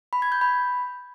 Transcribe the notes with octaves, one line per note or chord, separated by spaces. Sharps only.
B5
G#6
G6
B5